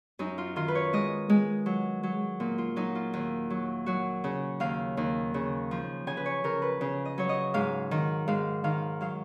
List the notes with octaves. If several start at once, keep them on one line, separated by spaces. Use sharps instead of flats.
F#2 D#4
F4
D#3 F4
B4
C#5
G#3 D#5
G#3
F#3
F#3
A#2
F4
F#3 D#4
F4
D#2
F#3
F#3 F#4
C#3
D#2 F5
D#2
C#3
F3
C#3 G#5
B4
C#5
C#3 A#4
B4
C#3
D#5
F#3 C#5
D#5
G#2 F5
D#3
G#2 F5
D#3 F5
F#3 F5